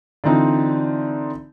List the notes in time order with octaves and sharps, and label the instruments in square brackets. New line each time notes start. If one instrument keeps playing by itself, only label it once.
[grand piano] D3 E3 C4 D#4 F4